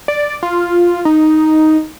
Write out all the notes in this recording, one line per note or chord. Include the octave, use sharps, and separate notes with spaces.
D5
F4
D#4